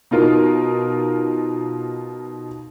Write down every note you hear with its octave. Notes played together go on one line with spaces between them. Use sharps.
B2 D#4 F4 A#4